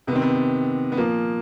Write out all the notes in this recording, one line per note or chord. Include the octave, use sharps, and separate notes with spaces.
C3 D#3 B3 C4
B3
B3
A#2 F3 A#3